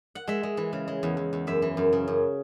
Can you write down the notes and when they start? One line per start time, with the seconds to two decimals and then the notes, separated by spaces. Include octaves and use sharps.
0.15 F#5
0.28 G#3 E5
0.43 G#3
0.57 E3
0.73 C#3
0.88 G#3
1.03 E2
1.17 E2
1.33 E2
1.47 F#2 E5
1.62 E3
1.77 F#2
1.93 C#3
2.08 F#2